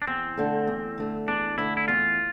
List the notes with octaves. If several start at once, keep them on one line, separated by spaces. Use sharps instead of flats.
D4
E2 C4
D3 A3
E2
D3 A3
E2 D4
D3 A3 E4
E4
E2 F4